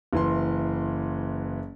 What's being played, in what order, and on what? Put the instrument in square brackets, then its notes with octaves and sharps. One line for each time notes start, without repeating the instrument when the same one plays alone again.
[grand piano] F#1 E3 C6